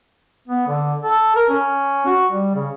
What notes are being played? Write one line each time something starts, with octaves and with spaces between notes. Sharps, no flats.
B3
D3
A4
A#4
C#4
F#4
G3
C#3